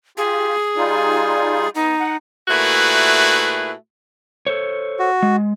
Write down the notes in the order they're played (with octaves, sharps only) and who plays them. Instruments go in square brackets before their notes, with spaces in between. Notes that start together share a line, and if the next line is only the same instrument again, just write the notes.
[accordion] F4 G4 [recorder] G#4
[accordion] G3 D#4 F4
[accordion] B3 [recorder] D#4
[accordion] F#5
[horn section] A#2 A3 E4 F#4 G#4 B4
[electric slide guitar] A4 C5 C#5
[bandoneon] F#4
[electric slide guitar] G#3